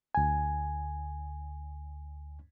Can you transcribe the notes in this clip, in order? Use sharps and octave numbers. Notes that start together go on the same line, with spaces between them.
D2 G#5